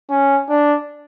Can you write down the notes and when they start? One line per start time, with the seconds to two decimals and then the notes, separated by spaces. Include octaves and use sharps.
0.10 C#4
0.49 D4